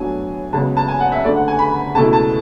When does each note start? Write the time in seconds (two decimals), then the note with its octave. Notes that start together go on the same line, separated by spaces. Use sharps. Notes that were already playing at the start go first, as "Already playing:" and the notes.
Already playing: A2 F#3 B3 D4 G#5
0.53 C#2 C#3 F#3 B3 A5
0.77 A5
0.88 G#5
1.00 F#5
1.12 E5
1.24 D2 D3 A3 D5
1.36 F#5
1.48 G#5
1.59 B5
1.94 C#2 B2 A3 E4 A5
2.13 A5